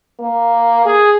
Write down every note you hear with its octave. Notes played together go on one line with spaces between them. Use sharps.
A#3
G#4